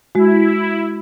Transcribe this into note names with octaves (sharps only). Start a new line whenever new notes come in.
G#3 E4 F#4